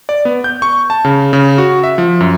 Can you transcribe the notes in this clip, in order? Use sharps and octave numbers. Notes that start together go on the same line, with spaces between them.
D5
B3
G6
C#6
A5
C#3
C#3
F#4
E5
F3
F#2